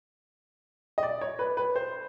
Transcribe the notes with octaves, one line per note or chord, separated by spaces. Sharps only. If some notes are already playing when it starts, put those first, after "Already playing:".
D#5
D5
C#5
B4
B4
C5